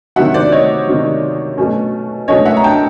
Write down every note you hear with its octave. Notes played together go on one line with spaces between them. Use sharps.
C3 D#3 F#3 E5 F#5
C5 D5
C#5 D#5
C3 D#3 F#3
B2 F#3 A3 C#4
B2 F#3 A3 C#4 C#5 D#5
E5 F#5
A#5
G5 A5